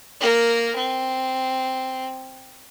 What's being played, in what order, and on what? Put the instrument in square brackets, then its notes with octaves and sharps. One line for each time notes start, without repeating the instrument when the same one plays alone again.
[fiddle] A#3 A#4
C4